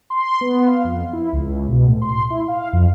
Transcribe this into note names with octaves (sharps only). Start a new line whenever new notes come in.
C6
B3
F5
F2
E4
C#2
B2
A2
C6
E4
F5
F2